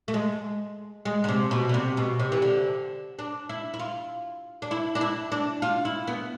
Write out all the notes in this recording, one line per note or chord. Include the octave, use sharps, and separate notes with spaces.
A3
G#3
G#3
D3
C3
B2
D3
C3
B2
C3
E3
D3
D4
E4
E4
F4
D4
E4
D4
E4
D4
F4
E4
B3